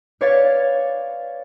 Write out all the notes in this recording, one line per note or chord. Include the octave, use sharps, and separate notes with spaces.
B4 C#5 D5 F5 G#6 A6